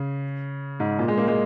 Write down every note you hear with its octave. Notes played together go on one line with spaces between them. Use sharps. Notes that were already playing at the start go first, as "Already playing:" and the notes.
Already playing: C#3
G#2
A#2
G#3
A#3
G#3